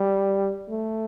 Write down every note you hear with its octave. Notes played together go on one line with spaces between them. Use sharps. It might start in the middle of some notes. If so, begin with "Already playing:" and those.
Already playing: G3
A3